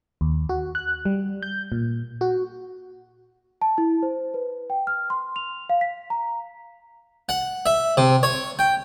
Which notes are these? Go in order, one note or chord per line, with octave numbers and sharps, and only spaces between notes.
D#2
F#4
F#6
G3
G6
A#2
F#4
A5
E4
C5
B4
G5
F6
C6
F7
F5
B6
A#5
F#5
E5
C3
C#5
G5